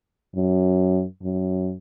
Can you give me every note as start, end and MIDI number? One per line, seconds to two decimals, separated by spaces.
0.36 1.04 42
1.23 1.74 42